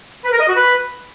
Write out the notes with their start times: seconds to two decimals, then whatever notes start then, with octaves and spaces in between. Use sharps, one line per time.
0.24 B4
0.32 A#4
0.40 D#5
0.48 F#4
0.56 B4